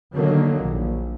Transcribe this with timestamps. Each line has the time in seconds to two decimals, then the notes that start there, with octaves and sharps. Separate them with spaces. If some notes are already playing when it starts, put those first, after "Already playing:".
0.15 D3 D#3 F#3 A#3
0.60 A#1